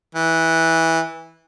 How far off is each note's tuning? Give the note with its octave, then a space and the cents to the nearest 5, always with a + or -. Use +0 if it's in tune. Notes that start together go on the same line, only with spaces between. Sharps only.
E3 -15